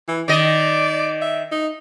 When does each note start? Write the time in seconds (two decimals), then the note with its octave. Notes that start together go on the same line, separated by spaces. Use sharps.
0.08 E3
0.28 D#3 D5 D#5
1.21 E5
1.52 D#4